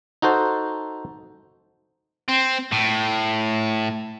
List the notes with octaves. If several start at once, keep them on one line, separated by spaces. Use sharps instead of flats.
D#4 F#4 A4 C5
C4
A2